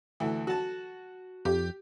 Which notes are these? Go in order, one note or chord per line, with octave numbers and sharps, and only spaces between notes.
D2 E3
F#4 A5
F2 G4